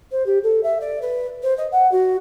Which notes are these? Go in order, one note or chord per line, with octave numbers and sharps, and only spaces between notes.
C5
G4
A4
E5
D5
B4
C5
D#5
F#5
F#4